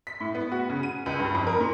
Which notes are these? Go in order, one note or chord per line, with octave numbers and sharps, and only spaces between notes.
B6
A2
B3
F#4
C#3
D#7
C#2
G2
F2
A#4
A#2